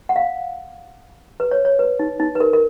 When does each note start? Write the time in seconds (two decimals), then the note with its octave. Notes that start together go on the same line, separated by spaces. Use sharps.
0.09 F#5
0.16 F5
1.40 B4
1.51 C#5
1.65 C#5
1.79 B4
1.99 D#4
2.20 D#4
2.35 B4
2.40 A#4
2.53 A#4